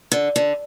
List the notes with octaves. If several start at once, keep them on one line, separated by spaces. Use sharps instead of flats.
D3
D3